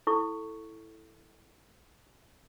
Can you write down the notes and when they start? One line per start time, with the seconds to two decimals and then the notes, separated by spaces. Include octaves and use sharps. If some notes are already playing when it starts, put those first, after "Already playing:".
0.07 E4 A4 C#6